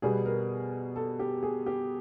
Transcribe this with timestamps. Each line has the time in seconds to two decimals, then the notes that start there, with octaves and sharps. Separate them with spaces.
0.02 B2 G3 B3 G#4
0.26 A#4
0.96 A4
1.19 G4
1.43 G#4
1.66 G4